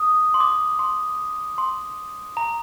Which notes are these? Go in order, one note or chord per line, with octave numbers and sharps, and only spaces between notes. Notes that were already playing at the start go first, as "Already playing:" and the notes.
Already playing: D#6
C6
D6
C6
C6
A#5